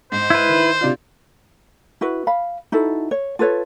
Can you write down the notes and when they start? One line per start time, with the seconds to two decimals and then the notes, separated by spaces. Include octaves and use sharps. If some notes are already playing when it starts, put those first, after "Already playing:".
0.12 G#2 C5
0.30 E4 B4
0.49 D#3
0.81 C3 D4 F4
2.01 E4 F#4 B4
2.27 F5 B5
2.72 D#4 E4 F#4 A4
3.11 C#5
3.39 F4 A4 B4 C#5